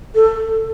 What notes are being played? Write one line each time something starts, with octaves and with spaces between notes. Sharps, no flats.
A4